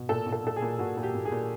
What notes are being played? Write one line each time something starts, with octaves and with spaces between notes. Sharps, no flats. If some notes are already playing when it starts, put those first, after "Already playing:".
Already playing: B2
A#2 A4
A#2
A4
A#2 A4
G#4
A#2
A#2 F#4
A#2
G4
A#2
G#4
A#2